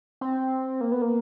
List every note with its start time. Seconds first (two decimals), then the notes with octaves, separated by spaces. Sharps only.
0.21 C4
0.81 A#3
0.92 B3
1.02 A#3